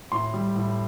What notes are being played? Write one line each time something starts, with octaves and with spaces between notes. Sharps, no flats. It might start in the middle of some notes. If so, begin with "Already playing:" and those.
A2 C6
G3
A2